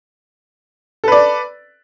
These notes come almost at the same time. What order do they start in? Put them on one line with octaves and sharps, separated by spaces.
A4 B4 D5